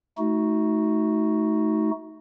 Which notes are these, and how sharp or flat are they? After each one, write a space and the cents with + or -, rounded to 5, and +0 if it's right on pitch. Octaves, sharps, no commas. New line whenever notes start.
A3 -20 D#4 +20 F#4 +0